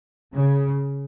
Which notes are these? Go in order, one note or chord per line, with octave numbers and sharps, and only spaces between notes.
C#3